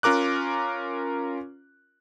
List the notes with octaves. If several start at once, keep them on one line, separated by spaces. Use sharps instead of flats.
C#4 F4 A#4 D6 F#6